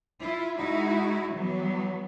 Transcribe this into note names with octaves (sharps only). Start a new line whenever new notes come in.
E4 F4
G#3 D#4 E4 F#4
E3 F#3 G3 B3